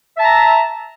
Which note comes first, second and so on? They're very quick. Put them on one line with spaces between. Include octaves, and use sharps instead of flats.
E5 A5 A#5